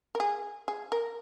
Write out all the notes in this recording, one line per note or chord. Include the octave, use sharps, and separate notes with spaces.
A#4
G#4
G#4
A#4